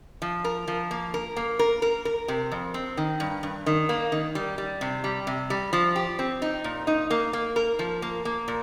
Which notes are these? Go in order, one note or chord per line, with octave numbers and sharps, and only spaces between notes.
F3
A#4
F3
A#3
A#4
A#3
A#4
A#4
A#4
C3
F2
C4
D#3
G2
G2
D#3
A#3
D#3
G3
G3
C3
G3
C3
G3
F3
G4
C4
D#4
A#2
D#4
A#3
A#3
A#4
F3
A#3
A#3
A#2